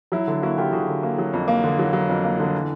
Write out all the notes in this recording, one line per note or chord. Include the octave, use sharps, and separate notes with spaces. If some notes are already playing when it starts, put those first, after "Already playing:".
F#3 E4
D3
A#3 E4 F#4
D3 F4 G4
D3 F#4 G#4
D3
A#3
F#3
F2
A#3
D3
F#3
F#3
F2
A#3
D3
E3